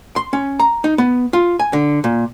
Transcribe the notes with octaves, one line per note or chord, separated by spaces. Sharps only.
C6
C#4
A#5
D#4
B3
F4
G#5
D3
A#2